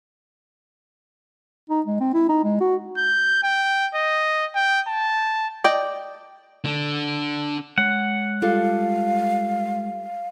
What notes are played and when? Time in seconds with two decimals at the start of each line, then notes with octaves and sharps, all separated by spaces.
1.70 D#4
1.86 G#3
2.00 C4
2.14 E4
2.29 D#4
2.44 G#3
2.60 F#4
2.97 G6
3.43 G5
3.95 D#5
4.55 G5
4.88 A5
5.64 D5 D#5 G5
6.64 D3 D4
7.78 G#3 C#5 F#5
8.42 G3 F4 A4 F5